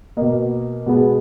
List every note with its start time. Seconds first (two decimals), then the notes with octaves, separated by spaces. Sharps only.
0.17 B2 A#3 D#5
0.86 B2 G#3 B3